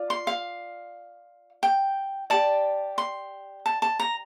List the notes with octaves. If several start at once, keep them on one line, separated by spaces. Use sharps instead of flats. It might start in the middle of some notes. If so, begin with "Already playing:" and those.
Already playing: F4 D5
C6
F5
G5
G4 D5 A5
C6
A5
A5
A#5